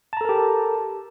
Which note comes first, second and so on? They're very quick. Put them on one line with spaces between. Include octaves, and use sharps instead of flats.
A5 A#5 A4 A#4 G4